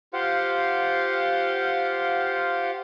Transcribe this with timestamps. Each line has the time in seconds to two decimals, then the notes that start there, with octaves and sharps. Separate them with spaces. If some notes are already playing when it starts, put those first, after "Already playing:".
0.13 F4 G4 C5 F5 F#5